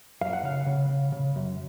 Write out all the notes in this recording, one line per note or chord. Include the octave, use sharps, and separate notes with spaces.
F#2 F5
F#5
C#3 F5
C#3
C#3
C#3
F#2